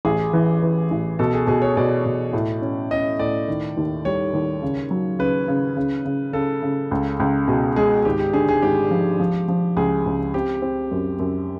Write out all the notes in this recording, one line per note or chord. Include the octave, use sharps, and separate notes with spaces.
A1 G#4
E3
E3
A1
B2 A4
G#4
B2 G#4
C#5
B2 D5
B2
A2
C#4
C#4 D#5
A2 D5
D#3
D#2
G3 C#5
D#2
C#3
F#3
C#3 B4
C#3
C#3
C#3
C#3 A4
C#3
C#2
C#2
B2 G#4
G#3 G#4
G#1 G4
G4
D3 G#4
G#4
G#1 G4
F3
F3
F3
C#2 G#4
C#2
C4 G4
C4
F#2
F#2